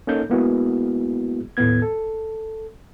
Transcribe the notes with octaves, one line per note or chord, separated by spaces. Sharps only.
A#3 C#4 D#4 A4 G6
G#3 A#3 B3 E4 F#4 G#4
D#2 A2 A3 B3 G#6
A4